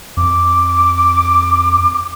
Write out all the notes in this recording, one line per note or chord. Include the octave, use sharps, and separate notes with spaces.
F2 D6